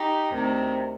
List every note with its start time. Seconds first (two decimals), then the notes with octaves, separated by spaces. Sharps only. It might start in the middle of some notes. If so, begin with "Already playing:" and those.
Already playing: D#4 G4
0.30 D2 C3 D#3